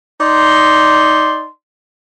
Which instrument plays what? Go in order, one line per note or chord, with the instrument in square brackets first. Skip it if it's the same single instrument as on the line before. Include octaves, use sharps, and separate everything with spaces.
[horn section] D#4 D5 C6